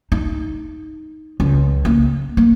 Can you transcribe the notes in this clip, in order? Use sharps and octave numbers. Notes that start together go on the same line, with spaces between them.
D#4
C#2
A#3
A#3